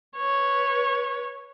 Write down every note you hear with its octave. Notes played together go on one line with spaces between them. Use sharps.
B4 C#5